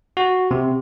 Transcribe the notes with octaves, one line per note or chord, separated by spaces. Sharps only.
F#4
C3